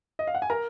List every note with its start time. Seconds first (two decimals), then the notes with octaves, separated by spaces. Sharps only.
0.19 D#5
0.27 F5
0.35 F#5
0.42 G#5
0.50 A#4 A#5